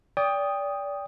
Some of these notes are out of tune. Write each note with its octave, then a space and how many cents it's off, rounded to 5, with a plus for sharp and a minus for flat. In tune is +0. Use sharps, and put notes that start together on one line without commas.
D5 -30 G5 +20 D#6 +0